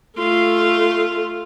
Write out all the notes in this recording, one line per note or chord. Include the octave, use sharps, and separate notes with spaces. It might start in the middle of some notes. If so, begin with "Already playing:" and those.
A3 F4